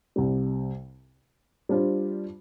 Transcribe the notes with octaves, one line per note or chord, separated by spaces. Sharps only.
C2 C3 G3
G3 D4 F4 C5